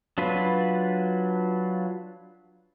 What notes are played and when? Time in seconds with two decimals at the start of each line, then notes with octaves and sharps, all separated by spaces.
0.18 F#3 D4 F4 B4